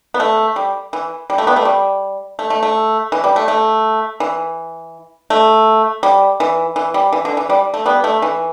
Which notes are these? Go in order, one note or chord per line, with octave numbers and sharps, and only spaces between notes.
B3
A3
G3
E3
G3
A3
G3 B3
A3
G3
A3
A3
A3
E3
G3
A3
A3
E3
A3
G3
E3
E3
G3
E3
D3
E3
G3
A3
G3 B3
A3
E3